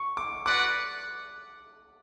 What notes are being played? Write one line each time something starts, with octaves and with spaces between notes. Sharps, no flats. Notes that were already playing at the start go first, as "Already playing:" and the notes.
Already playing: C#6
D6
F#4 B4 D5 F#5 D6